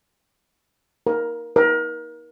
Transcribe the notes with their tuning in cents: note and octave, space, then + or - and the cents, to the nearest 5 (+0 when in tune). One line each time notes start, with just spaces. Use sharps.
A#4 +10
A#4 +30